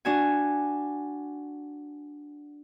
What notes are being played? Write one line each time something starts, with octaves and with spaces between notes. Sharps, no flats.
D4 F#4 G#5